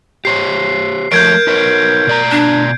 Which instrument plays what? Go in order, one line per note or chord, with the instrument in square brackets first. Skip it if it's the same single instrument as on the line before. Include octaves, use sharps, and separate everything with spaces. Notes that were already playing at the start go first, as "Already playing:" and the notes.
[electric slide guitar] G4 C5 C#5 [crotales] C7
[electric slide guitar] F3 A3 C#5 [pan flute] A#4 [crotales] G6 G#6 D7
[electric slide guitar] D#4 B4 C#5
B2 D5 A#5
[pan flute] D4